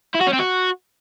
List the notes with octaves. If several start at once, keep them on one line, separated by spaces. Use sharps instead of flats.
E4
F#4
C#4
C4
F#4